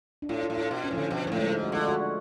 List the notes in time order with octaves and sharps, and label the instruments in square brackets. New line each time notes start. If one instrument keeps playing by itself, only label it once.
[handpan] D4
[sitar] A2 [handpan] F4
[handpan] F4
[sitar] A2
[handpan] F4
[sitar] B2
[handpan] C#4
[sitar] A2 [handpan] F3
[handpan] D3
[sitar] B2 [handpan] F3
[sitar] G#2 [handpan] F3
[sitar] A2 [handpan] A3
[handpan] G#3
[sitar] G#2
[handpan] F#4
[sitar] D3 [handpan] F4
[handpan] F#4